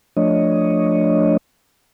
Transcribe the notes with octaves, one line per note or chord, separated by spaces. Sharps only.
F3 A3 D4 C#5 D#5